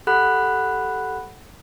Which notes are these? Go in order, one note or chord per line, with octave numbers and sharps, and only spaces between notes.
G4 A4 F#5 B5 F#6